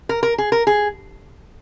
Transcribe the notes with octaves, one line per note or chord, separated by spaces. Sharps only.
A#4
A#4
G#4
A#4
G#4